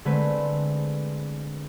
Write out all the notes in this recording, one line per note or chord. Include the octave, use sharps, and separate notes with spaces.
D3 G#3 A3 C4 B4